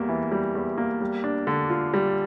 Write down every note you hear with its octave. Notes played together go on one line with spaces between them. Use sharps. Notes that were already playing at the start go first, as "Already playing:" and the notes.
Already playing: E2 G3 A#3
E3
G3
E2
A#3
G3
D4
D3
F4
G3